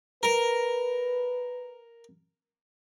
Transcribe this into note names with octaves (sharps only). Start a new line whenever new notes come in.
A#4 B4